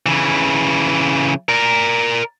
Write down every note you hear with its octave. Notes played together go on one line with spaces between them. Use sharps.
C#3 E3
A#4 D5